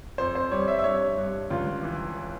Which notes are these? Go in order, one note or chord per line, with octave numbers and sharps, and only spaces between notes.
F2 C5
C5
G3 C#5
E5
E5
G2 C#5
G2
C#2 F4
E3